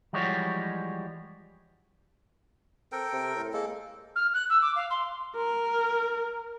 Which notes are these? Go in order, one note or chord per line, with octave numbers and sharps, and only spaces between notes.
E3 F3 G3 G#3 F#4 C#5
C4 A4 A#4 G5
C3
A2
G#3 A#3 A4
F6
F#6
E6
D6
F5
C6
A#4